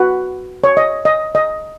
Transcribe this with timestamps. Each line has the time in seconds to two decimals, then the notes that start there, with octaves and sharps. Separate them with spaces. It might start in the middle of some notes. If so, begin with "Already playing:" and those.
Already playing: F#4 B4 F#5
0.64 C#5
0.77 D#5
1.05 D#5
1.35 D#5